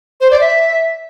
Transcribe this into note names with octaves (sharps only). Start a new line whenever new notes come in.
C5
D5
E5